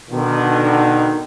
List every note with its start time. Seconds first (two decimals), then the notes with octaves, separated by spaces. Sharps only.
0.10 B2 D3 D#3